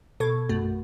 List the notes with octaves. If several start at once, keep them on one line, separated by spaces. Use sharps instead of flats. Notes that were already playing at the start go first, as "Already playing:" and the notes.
B2 A4 C#6 G#6
A#1 F#2 A3 F#4